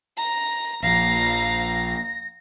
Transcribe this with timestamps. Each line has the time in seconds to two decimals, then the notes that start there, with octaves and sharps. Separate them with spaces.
0.18 A#5
0.83 A#1 F3 F5 A#5 A#6
1.43 A#6